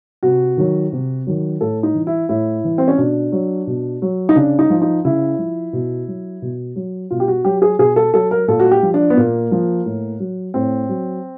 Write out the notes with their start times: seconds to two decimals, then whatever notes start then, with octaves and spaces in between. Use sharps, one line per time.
0.23 C3 F#4
0.57 D#3 F#3
0.92 C3
1.27 D#3 F#3
1.61 A2 A4
1.83 D#4
1.95 E3
2.07 E4
2.29 A2 E4
2.64 E3
2.78 C4
2.88 C#4
2.98 B2 D4
3.32 F#3
3.67 B2
4.02 F#3
4.29 D#4
4.36 C#3 D4
4.59 D#4
4.70 F3
4.82 D#4
5.05 C#3 E4
5.39 F3
5.73 B2
6.08 F#3
6.42 B2
6.76 F#3
7.11 B2 F4
7.20 G4
7.28 F#4
7.45 F#3 G4
7.62 G#4
7.79 B2 G#4
7.96 A4
8.14 F#3 A4
8.31 A#4
8.48 A#2 A4
8.60 F#4
8.71 G4
8.83 F3
8.94 D4
9.10 B3
9.17 A#2 A#3
9.52 F3
9.85 A2
10.20 F#3
10.54 A2 C4
10.89 F#3